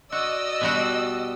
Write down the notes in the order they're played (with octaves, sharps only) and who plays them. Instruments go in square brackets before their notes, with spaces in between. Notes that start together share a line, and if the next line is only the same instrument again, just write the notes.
[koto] F#4 [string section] D5 D#5 E6
[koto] B2 G3 F#4